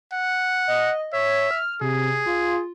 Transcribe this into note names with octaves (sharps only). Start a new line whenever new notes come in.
F#5
D#5
C#5 E5
F6
C3 G#4
F4